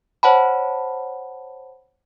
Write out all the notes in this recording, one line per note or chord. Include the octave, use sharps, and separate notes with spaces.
C5 C#5 F#5 A5 B5